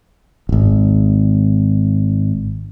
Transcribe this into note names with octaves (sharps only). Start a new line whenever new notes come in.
D#1 G#1